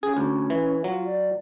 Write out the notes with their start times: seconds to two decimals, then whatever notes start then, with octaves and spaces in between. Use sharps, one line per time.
0.03 C#4 G#4
0.17 D2
0.50 E3
0.84 F#3 F4
1.05 D5